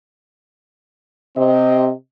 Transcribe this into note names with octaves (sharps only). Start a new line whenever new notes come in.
C3 C4 D#5